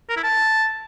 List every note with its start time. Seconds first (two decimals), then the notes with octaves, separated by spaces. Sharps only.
0.10 A#4
0.17 E4
0.24 A5